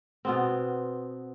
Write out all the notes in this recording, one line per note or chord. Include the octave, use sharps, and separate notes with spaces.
B2 B3 C4